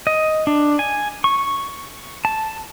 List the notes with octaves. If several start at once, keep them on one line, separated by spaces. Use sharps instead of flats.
D#5
D4
G#5
C#6
A5